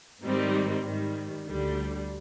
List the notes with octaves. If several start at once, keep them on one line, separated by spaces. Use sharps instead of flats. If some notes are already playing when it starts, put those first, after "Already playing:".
G#2 D#3 G3 C4 D#4
G#2 D#3 G3
D2 D3 G3